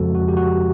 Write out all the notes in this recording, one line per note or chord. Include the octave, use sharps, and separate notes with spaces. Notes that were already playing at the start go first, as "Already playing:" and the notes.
Already playing: F2 C#3 F3 G#3 F#4 A4
F#4
G4
F#4